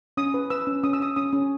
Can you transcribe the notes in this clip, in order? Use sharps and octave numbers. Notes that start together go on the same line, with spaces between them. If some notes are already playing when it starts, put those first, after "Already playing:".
C#4 D#6
B4
B4 E6
C#4
C#4 D#6
E6
C#4 D#6
C#4 D#6
C#4